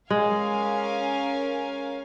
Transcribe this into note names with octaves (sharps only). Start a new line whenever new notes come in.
G#3 C#4 A#4 F5 G#5